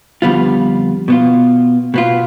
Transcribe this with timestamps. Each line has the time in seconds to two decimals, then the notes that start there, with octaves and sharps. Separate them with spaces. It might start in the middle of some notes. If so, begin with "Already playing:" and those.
0.22 F2 D3 G3 B3 F4
1.08 B2 B3 F4
1.94 B2 B3 F4